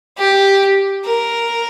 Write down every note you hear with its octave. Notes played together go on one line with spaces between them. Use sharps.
G4
A#4